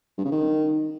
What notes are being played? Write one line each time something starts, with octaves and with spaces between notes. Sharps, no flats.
G2
C#3
D#3